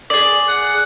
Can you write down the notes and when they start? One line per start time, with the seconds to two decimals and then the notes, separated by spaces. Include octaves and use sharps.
0.10 G#4 D5
0.49 F#5